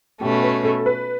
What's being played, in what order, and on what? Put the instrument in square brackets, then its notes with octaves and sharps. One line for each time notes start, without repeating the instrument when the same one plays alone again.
[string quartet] B2 A3 C#4 [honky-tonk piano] G4
[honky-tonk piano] B4
A4
B4